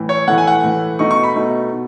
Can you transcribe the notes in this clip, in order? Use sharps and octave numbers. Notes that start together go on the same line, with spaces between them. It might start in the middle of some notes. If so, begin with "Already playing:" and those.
Already playing: A2 E3
C#5
A2 E3 A3 F#5
G#5
F#5
A2 E3 A3
B2 A3 D#4 C#6
C#6
B5
B2 A3 D#4
B2